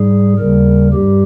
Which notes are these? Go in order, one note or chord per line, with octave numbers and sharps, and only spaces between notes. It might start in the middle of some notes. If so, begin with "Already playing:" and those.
Already playing: G#2 G3 G#4
D#2 C#3 G3 A#4
G2 G3 G4